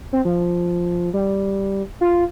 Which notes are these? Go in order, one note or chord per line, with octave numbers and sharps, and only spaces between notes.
C4
F3
G3
F4